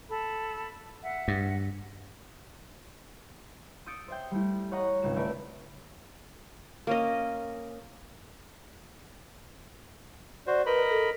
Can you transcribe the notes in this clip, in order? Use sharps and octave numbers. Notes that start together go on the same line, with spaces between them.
A4 B5
E5 F#5
G2
D#6 E6 G6 A6 C#7 D7
C5 E5 G5
G3 A3 E4
C#5 D#5 F#5 A#5
G#1 C#2 E7
A3 A#4 B4 D5 E5
A#3 C#4 D#5
F#4 C5 D5
A#4 B4 D#5 B5
A4